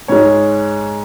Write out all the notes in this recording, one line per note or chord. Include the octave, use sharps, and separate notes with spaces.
G#2 G#3 C#5